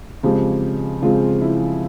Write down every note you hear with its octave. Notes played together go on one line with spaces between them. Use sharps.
C#3 F3 G#3 C4 G4
C#3 F3 G#3 C4 F4
E4